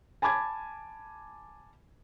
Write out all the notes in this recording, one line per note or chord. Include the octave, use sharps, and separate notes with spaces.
G#5 A5 B5 D6 G#6